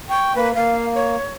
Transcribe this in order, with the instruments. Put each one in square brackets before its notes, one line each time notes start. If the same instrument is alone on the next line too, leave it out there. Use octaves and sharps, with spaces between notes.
[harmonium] G5 [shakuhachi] C#6
[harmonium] A#3 [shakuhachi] B4
[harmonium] A#3 [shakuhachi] F5
[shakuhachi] C#5